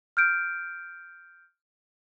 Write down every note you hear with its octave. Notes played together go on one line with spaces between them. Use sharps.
F6 G6 D7